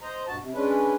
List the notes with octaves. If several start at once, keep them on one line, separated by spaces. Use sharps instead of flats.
C5 D#5 A#5
G2 B2 F#4 A5
C3
G#3 C#4 D4 B4